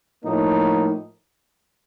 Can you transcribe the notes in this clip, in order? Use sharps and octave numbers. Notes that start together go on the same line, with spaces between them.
A2 F3 A#3 D#4